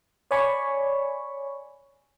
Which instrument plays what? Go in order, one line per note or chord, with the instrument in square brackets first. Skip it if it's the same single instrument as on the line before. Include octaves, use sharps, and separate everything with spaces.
[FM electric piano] C#5 D5 G#5 B5 C#6